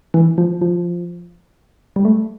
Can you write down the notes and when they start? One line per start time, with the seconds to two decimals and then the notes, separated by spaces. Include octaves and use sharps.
0.14 E3
0.38 F3
0.62 F3
1.96 G3
2.05 A3